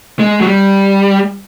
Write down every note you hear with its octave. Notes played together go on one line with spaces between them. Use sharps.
G#3
F#3
G3